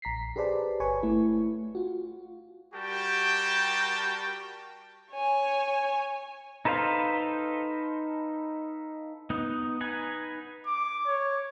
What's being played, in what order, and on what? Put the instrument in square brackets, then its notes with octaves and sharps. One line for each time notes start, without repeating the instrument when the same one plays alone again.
[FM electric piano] A#1 A#5 B6 C7
G4 G#4 B4 C5 D5 A5
G1 B4 C#5 G#5 C#6
A3 E4
F4 F#4
[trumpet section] G3 F#4 G4 A#4 G5 A5
[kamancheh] C#5 G#5
[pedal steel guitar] D#4 A4 B4 C5 F5
B3 D#4
D#4 B4 F#5 G#5
[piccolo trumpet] D6
C#5